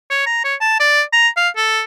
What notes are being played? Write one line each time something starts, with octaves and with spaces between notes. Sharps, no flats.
C#5
A#5
C#5
A5
D5
A#5
F5
A4